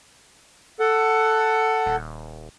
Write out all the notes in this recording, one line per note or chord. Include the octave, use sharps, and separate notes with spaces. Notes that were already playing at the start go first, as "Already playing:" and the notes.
A4 F#5
D#1